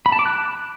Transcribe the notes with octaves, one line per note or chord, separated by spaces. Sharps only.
B5
A5
D6
F#6